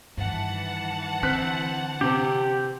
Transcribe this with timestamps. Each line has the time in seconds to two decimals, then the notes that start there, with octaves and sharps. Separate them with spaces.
0.17 G2 D#3 E3 F#5 A5
1.23 D3 C4 F#6 B6
2.01 C3 C4 G4